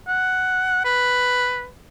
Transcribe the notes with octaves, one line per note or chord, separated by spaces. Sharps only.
F#5
B4